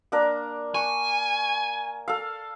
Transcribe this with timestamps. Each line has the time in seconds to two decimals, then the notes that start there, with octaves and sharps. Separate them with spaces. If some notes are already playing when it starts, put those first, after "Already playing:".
0.12 A#3 D4 A#4
0.74 G#5 C#6
2.08 A4 F5